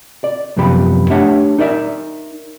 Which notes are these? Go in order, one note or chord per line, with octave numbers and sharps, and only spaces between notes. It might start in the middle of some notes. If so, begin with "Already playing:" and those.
D5
C2 F#2 F3 B3 G4 B5
A3 D4 G4 C#5 E5 F#5
D#4 A#4 D5 E5